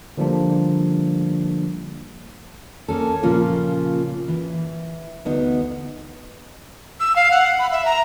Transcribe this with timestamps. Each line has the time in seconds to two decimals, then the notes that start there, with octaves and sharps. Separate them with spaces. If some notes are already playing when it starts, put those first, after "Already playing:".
0.17 D3 F3 G3 A#3 D4
2.88 A#3 C#4 A4
3.23 A#2 C#3 F3 A#3 C#4 F4
4.28 E3
5.25 D2 B3 D#4
7.00 E6
7.16 F5
7.31 F#5
7.59 B5
7.72 E5
7.85 A#5